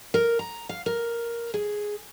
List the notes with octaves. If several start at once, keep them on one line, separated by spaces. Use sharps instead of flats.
A#4
A#5
F5
A#4
G#4